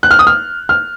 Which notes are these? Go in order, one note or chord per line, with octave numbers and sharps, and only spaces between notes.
F#6
F6
D#6
F6
F6